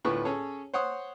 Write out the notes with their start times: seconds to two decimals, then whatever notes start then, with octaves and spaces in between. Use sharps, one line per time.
0.05 D2 A2 B3 F4 B4 C#6
0.25 C#4 G#4 A4 C#5 A5
0.74 C5 C#5 F#5 C6 D#6